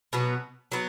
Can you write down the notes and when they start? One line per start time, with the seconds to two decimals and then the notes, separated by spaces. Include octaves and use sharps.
0.13 B2 F#3 B3
0.72 F#3 B3